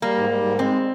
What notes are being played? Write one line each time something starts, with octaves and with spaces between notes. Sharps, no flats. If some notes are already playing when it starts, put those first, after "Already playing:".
G3 A#3
G#2
G3
G#2
G#3 C4